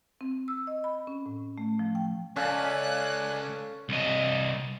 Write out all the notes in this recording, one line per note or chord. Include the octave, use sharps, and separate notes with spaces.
C4
E6
D#5
B5
C#4
A2
A3
F3
G5
C#2 C#4 A4 D5 F5 G#5 F#6
C2 D#5